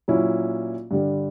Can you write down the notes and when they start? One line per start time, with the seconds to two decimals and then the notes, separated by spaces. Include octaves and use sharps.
0.08 A#2 F#3 C#4 E4
0.91 G2 D3 G3